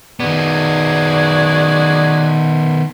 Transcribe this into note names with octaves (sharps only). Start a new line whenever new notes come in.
D#3 B3 F#4 G#4 D5